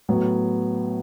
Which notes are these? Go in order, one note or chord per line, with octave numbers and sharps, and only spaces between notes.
A2 F#3 B3